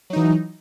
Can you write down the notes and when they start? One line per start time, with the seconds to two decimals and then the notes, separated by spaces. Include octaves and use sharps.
0.10 F#3
0.13 D#4
0.16 E3